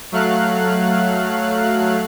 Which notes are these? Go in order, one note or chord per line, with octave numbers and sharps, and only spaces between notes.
F#3 A3 F5 F#6